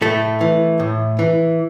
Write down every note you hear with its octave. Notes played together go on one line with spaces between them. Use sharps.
A2 A3
E3
A2
E3